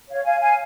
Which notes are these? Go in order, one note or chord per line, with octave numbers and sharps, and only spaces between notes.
C#5 F5
F5 G#5
F5 G#5